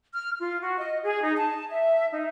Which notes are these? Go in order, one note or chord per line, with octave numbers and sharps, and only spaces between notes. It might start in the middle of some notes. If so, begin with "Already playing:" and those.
F6
F4
F#4
D#5
G#4
D#4
A5
E5
D#4